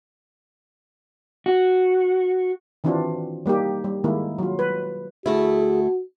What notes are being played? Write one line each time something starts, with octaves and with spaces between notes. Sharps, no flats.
F#4
D#3 E3 C4 D4 F4 F#4
G3 A#3 D#4 G4
G3
D#3 G#3 A#3 E4
F#3 F4
B4
D2 A3 E4 F#4 G#4